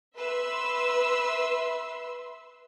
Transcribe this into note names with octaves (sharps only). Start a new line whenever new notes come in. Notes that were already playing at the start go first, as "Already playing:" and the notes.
B4 E5 C6 E6